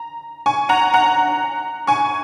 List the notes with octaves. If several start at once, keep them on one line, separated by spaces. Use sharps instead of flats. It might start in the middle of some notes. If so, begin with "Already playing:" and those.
Already playing: A#5
G#5 C#6
F#5 A#5
F#5 A#5
G#5 C#6